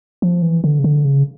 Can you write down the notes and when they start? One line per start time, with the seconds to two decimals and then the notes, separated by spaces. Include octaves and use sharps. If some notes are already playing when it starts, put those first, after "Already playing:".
0.22 F3
0.42 E3
0.64 D3
0.79 C#3
0.84 D3
1.05 C#3